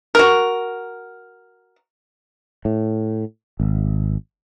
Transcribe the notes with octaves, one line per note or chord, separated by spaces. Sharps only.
F#4 A#4
A2
G#1